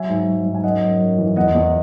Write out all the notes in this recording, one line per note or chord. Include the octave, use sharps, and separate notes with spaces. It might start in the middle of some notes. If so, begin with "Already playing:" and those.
Already playing: F#3 E5 G#5
G#2
F#3
G#2
G#5
F#2 D#5 F#5
F#2
F#2
E3
E2 D#5 F#5
E2